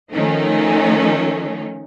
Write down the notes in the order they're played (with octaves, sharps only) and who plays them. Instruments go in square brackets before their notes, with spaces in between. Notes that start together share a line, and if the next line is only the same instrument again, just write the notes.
[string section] D#3 F3 A3 C#4 D#4